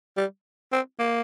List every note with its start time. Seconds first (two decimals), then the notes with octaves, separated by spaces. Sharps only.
0.17 G3
0.72 C4
0.99 A#3